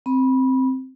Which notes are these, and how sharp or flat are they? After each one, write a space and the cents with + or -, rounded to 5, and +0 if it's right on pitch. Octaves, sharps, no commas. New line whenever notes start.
C4 +0 B5 -20